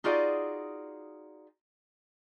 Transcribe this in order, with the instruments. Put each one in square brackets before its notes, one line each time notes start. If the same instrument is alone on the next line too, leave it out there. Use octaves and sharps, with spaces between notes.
[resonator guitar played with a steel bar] D#4 F4 F#4 G#4 D5 D#5